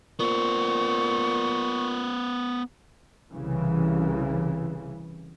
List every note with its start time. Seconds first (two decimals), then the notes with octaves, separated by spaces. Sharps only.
0.19 A#2 B3 C5 C#6
3.32 C2 C#3 E3